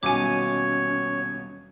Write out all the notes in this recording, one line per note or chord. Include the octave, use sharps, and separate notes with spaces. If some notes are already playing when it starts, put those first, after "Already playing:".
D#1 B1 B2 C#4 C#5 G#5 D6